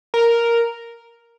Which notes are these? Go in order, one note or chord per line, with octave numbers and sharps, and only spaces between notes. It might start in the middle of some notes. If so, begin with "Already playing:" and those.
A#4